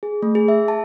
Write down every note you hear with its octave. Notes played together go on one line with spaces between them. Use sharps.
G#4
A3
G#4
E5
A5